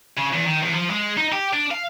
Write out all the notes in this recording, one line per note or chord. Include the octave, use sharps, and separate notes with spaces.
C#3
E2
D#3
E2
F3
G#3
D#4
G4
D4
F5